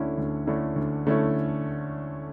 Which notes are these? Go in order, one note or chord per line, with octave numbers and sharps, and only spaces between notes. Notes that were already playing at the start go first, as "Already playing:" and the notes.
Already playing: D2 D3 A3 C#4 E4
D2
D3 A3 C#4 E4
D2
D3 A3 C#4 E4